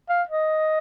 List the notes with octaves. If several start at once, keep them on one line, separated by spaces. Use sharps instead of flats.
F5
D#5